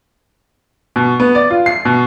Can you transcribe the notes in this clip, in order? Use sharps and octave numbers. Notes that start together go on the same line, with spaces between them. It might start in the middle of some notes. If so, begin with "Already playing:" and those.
B2
B3
D5
F4
C7
B2